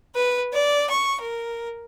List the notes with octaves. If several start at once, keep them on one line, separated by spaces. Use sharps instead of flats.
B4
D5
C#6
A#4